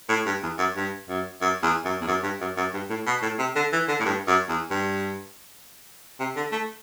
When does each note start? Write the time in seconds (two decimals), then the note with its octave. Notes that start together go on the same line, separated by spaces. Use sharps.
0.09 A2
0.26 G2
0.43 E2
0.58 F#2
0.76 G2
1.09 F#2
1.41 F#2
1.63 E2
1.85 F#2
2.01 E2
2.07 F#2
2.23 G2
2.41 F#2
2.57 F#2
2.73 G2
2.90 A2
3.06 B2
3.22 A2
3.39 C3
3.56 D3
3.72 E3
3.88 D3
4.00 A2
4.05 G2
4.27 F#2
4.49 E2
4.71 G2
6.20 C3
6.36 D3
6.52 A3